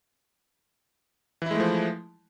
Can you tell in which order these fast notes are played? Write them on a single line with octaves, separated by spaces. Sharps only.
E3 E4 G#3 A3 F3